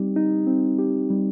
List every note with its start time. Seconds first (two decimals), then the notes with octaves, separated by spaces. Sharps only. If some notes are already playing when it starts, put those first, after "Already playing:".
Already playing: G3 C4 D#4 G4
0.16 D#4
0.47 C4
0.79 G4
1.10 G3